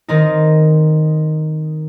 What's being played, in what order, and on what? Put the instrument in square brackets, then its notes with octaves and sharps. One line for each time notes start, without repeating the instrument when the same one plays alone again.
[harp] D#3 C4 D#4